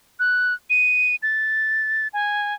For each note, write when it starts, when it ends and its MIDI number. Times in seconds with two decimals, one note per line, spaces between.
0.20 0.54 90
0.70 1.16 99
1.23 2.08 93
2.13 2.54 80